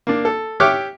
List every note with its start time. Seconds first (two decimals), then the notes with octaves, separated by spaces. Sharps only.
0.07 A#3 D4
0.25 A4
0.60 G4 C#5 E5 D6 F6 F#6